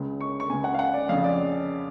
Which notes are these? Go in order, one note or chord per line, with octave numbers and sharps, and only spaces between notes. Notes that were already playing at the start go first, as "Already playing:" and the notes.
Already playing: C#2 C#3
C#6
C#6
C#2 C#3 G#5
F#5
F5
F#5
D5
F2 C#3 F5
D5